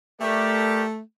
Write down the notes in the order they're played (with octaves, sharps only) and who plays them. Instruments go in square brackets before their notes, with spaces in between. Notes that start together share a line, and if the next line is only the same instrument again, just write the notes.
[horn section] A3 [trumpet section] G4 A#4 D5